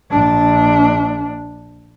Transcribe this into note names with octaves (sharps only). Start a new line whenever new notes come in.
A#1 D4